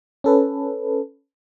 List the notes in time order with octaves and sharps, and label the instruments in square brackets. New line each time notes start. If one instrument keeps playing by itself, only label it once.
[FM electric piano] C#4 A4 B4